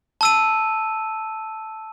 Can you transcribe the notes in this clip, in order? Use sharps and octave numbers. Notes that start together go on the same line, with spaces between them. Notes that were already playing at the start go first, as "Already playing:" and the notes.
A5 E6 D#7